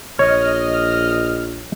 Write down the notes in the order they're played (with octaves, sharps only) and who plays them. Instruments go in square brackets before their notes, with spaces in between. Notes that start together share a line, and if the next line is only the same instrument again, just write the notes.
[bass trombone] A#1 [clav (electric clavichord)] C#5 [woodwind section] D#5 F6